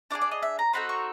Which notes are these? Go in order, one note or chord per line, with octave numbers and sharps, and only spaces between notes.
D4 F4 G#4 D5
D5
D#5
E5
A#5
C4 D#4 F#4 A4 B5
C#6